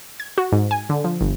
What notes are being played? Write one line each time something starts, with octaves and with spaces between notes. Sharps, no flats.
G#6
F#4
G#2
G#5
D3
F3
G1